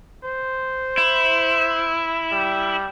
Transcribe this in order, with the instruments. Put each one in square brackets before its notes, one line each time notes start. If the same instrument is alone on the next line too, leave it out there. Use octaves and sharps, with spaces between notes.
[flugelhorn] C5
[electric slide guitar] E4
[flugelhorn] G3